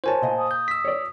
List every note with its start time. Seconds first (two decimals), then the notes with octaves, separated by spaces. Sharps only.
0.04 F#4 A#4 C5 C#5 G#5 A5
0.22 A#2 D#5
0.39 D#6
0.51 G6
0.68 E6 B6
0.85 C#5 D5